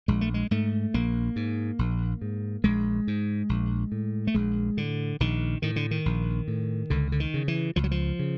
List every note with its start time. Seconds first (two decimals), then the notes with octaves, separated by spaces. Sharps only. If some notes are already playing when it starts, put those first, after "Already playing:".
0.08 A#1 G#3
0.21 A3
0.34 G#3
0.51 G#2 A3
0.94 A#1 A#3
1.36 G#2
1.79 A#1
2.21 G#2
2.64 A#1 G#3
3.07 G#2
3.49 A#1
3.92 A2
4.27 A3
4.34 A#1 G#3
4.77 A2 D3
5.20 A#1 D#3
5.62 A2 D#3
5.76 D3
5.91 D#3
6.06 A#1
6.48 A2
6.90 C#2 D3
7.12 D3
7.20 D#3
7.34 C#3
7.48 E3
7.76 C#2 F3
7.84 F#3
7.91 F3
8.19 C#3